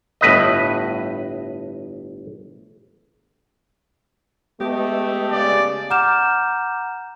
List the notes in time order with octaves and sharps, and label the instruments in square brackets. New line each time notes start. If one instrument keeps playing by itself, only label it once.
[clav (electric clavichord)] G1 A2 B4 D#5
[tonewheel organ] G#3 B3 D#5 [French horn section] A3 [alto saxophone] G4
[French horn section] C#3 [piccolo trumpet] D5
[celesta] F#5 A#5 D6 F6 G6 E7